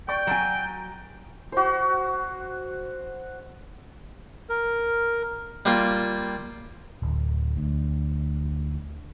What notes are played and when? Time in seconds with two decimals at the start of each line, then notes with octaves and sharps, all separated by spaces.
0.08 D5 G5 C#6 A6
0.27 F#3 G#5 A#5 A6 D7
1.52 F#4 C5
4.49 A#4
5.65 G3 A#3 F4
7.02 D1
7.57 D2